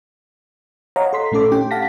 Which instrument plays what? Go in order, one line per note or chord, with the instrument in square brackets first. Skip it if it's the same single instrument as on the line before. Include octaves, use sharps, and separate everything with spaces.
[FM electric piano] C#5 D#5 F5 F#5 A#5
A4 C6 B6
A#2 A3 C#4 A4 D6
C#4 G4 G5
F5 F#5 A5 A#6 B6